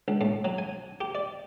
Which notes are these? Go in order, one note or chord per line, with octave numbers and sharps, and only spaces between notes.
C#2
A2
F#3
G#5
G4
D5